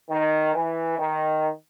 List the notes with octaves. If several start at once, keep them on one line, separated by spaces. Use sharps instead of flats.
D#3
E3
D#3